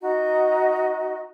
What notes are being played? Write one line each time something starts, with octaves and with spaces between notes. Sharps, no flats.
D#4 F#4 D#5 A#5